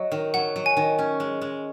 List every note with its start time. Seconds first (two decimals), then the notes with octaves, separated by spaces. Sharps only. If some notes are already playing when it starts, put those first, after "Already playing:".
Already playing: F#3 D#5
0.12 D#3
0.34 F#3 F#5
0.56 F#3
0.66 G#5
0.77 D#3
0.99 C#4
1.20 G#3
1.41 G#3